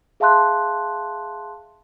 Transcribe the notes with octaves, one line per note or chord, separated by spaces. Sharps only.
G#4 E5 F5 A5 C6 F#6